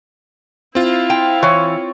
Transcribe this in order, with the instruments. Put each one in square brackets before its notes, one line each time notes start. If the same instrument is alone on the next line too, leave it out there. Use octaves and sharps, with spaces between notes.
[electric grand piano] C4 F4 [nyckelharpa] E4 F5
[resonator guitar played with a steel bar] G5
[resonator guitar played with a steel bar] E3 [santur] C#5